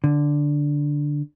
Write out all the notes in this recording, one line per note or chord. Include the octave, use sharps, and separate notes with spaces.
D3